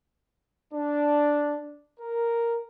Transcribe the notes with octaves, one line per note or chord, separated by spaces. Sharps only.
D4
A#4